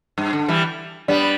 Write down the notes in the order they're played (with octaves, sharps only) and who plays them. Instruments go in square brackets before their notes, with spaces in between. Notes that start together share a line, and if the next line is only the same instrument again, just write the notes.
[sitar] G2
D3
E3 G3
[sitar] G3 B3 [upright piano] D4